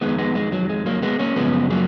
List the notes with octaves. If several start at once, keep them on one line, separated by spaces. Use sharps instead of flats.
F2 D#3 G#3 B3
G#3 B3
G#3
F#3
G#3
F#3 A#3
G#3 B3
A#3 C#4
F#2 C#3 F3 G#3 B3
F#3 A#3